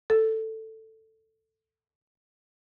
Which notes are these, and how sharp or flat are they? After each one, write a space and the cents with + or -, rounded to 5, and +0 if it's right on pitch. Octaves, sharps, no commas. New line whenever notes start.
A4 +10